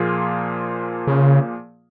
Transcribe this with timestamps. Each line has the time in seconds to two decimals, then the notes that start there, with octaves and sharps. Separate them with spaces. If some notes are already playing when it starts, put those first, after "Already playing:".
Already playing: A#2 F3 A#3 F4 G#4
1.07 C#3